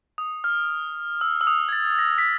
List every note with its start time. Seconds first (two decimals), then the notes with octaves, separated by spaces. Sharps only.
0.18 D#6
0.44 F6
1.21 E6
1.41 E6
1.47 D#6
1.69 G#6
1.72 A6
1.99 A#6
2.18 B6